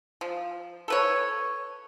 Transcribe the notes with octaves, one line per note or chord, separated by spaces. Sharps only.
F3
A4 B4 C#5